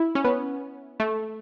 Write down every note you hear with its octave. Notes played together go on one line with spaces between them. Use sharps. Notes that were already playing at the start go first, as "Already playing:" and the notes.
Already playing: E4
C#4
B3
A3